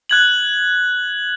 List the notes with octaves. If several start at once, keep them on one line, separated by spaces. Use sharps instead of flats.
F#6 G#6 F#7